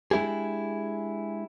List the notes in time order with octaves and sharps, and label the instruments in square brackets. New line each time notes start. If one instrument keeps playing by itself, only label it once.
[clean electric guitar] G#3 D4 E4 G4 G#4